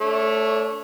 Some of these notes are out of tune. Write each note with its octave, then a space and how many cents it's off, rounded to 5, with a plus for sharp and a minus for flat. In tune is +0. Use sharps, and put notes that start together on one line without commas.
A3 +0 D4 -45 C#5 -20